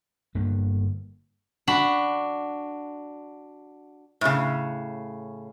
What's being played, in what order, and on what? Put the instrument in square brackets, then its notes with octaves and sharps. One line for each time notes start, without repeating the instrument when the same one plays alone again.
[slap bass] G1 G2 D3 A#3
[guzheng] D4 F#4 B5
[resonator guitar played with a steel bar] A2 C#3